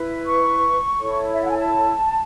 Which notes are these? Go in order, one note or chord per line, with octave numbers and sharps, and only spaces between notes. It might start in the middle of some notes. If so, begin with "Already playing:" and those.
Already playing: E4 B4
C#6
E4 A4 C#5
E5
F#5
G#5
A5